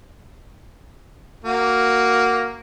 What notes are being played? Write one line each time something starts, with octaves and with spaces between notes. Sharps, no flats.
A#3 F#4